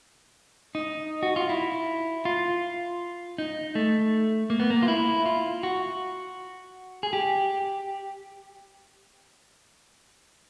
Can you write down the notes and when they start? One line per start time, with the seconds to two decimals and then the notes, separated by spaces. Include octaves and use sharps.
0.75 D#4
1.23 F#4
1.36 F4
1.49 E4
2.25 F4
3.38 D#4
3.75 A3
4.50 A#3
4.60 B3
4.70 A#3
4.83 F4
4.88 E4
5.26 F4
5.63 F#4
7.03 G#4
7.13 G4